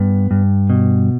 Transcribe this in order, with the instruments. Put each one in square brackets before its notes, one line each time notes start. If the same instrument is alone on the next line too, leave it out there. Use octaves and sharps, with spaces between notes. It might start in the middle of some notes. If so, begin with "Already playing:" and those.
Already playing: [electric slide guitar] G2 B3
G2
B2